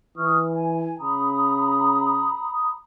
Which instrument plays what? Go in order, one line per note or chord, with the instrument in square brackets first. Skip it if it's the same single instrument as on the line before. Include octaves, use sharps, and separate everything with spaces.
[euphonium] E3 [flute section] C#6 D#6 F6
[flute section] G#5
[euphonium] C#3 [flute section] A#5 B5 D#6